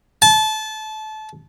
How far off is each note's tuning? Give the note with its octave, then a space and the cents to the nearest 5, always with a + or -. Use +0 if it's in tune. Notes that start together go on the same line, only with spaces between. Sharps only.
A5 -25